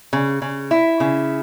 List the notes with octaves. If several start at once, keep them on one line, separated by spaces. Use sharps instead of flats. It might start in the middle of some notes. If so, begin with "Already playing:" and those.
C#3
C#3
E4
C#3